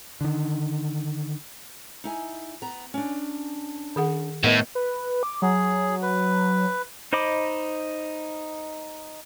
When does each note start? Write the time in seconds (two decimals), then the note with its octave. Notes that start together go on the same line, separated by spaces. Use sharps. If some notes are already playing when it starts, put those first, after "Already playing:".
0.21 D3 D#3
2.04 D#4 E4 G#5
2.62 B3 A#5
2.94 C#4 D4
3.96 D#3 G#4 F#5
4.44 A2 B3 D#4 A#4 B4 C#5 D#5
4.75 B4
5.23 D6
5.42 F#3 G#4
6.02 B4
7.13 D#4 C5 D#5 B5 D6